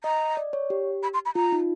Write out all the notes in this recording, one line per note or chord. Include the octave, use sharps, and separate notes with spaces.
D#5 A#5
D5
C#5
G4
B5
C6
B5
F4 A#5
D#4